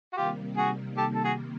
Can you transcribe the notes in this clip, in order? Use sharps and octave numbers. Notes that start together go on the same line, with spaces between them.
F#4
C3 D#3 G3 A#3 F4 G4
F#4 G#4
G4 A4
A4
F#4 G#4